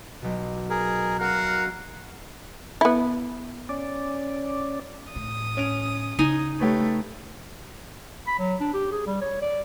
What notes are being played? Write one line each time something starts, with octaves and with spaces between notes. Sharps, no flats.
B1 B2
G#4 A#4
C#4 F#4 A#4 F5 F#5
B3 E4
C#4 D5
A2 D#6
C#4 D7 F7
C#3 D#4 G#5
A3 G4 B4 C#5
B5
F#3
D4
G4
G#4
G3
C#5
D5